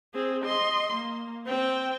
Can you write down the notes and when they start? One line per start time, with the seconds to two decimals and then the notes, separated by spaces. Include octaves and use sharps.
0.14 C4 G#4
0.45 D#5 C6
0.93 A#3
1.47 C4 G5